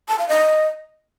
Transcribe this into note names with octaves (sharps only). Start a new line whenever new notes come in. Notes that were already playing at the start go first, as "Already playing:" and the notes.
A5
F5
D#5